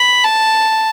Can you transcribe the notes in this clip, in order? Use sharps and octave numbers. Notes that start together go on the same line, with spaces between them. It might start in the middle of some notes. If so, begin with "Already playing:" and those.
Already playing: B5
A5